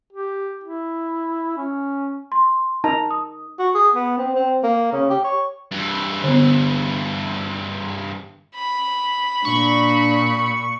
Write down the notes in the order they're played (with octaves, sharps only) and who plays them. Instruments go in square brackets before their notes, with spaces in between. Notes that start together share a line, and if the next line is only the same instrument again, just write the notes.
[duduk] G4
E4
C#4
[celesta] C6
[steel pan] D#4 A#5 [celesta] A5
[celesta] D#6
[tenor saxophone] F#4
G#4
B3
C4
C4
A#3
C#3
G4
C#5
[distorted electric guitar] G2 E3
[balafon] D3 B3
[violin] B5
[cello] A#2 [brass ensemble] D4 [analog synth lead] C#6